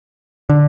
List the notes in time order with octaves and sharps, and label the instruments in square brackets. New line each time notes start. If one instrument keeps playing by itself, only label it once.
[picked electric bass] D3